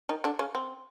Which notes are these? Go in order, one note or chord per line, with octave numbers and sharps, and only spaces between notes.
D#3 D#4
D3 D4
C#3 C#4
C4